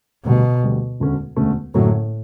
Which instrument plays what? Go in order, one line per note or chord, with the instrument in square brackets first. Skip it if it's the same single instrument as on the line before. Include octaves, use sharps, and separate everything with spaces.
[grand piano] D2 D3 G3 [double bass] B2
[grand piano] D2 D3 G3
E1 D2 D3 A3 C#4
E1 D2 D3 A3 C#4
[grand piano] F#1 F#2 D3 F#3 A3 [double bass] A2